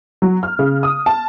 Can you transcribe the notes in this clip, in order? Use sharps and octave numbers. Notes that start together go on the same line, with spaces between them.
F#3
F6
C#3
D#6
A5